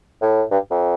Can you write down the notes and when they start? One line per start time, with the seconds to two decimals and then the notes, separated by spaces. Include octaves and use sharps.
0.22 A2
0.51 G2
0.71 F2